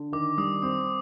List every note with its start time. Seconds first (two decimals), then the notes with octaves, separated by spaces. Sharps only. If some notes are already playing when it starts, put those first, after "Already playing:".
Already playing: D3
0.12 D#3 D6
0.38 G3 D#6
0.62 C4 D#6